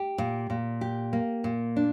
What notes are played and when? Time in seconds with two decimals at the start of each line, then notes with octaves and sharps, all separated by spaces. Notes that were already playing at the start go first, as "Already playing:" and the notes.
Already playing: G4
0.18 A#2
0.50 A#2
0.81 G4
1.13 A#3
1.44 A#2
1.76 D4